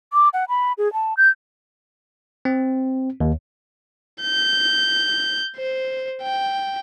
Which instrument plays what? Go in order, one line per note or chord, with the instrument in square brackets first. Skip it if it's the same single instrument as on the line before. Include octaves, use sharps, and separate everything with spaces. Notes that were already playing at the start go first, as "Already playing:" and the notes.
[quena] D6
F#5
B5
G#4
A5
G6
[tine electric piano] C4
D#2
[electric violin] G6
C5
G5